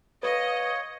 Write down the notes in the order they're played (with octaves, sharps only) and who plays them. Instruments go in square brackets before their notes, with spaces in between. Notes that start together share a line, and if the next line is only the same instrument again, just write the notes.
[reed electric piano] B4 [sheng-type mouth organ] C#5 [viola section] D#5 [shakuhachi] F5